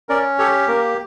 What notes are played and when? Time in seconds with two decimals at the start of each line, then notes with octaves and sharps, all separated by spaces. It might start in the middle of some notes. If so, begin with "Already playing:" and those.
0.09 C#4 A#4 D5
0.38 G4 A4 C#5
0.68 A#3 A#4